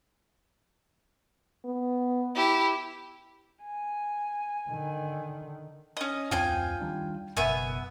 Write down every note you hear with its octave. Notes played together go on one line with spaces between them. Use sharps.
B3
E4 G4
G#5
D3 D#3
C#4 D#5
D1 F2 C4 F4 G5 G#5
D#3 G3 D4
F#1 B2 B3 E5 G#5